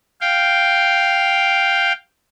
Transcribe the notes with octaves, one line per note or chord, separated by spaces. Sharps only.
F5 G5